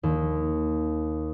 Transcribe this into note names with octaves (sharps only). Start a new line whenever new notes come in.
D#2